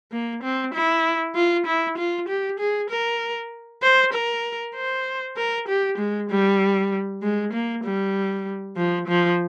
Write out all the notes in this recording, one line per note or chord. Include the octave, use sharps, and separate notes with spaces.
A#3
C4
E4
F4
E4
F4
G4
G#4
A#4
C5
A#4
C5
A#4
G4
G#3
G3
G#3
A#3
G3
F3
F3